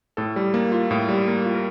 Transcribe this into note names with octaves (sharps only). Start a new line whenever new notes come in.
A2 A4
G3
A#3
F4
A2
G3
A#3
F4
A#4